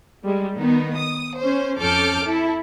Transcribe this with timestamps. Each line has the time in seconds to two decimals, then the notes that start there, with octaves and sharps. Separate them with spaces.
0.23 G3 G#3
0.57 D#3 B3 D#4
0.95 D#6
1.39 C#4 C5
1.79 F2 C#4 A4 D6 F6 G6
2.26 E4 A4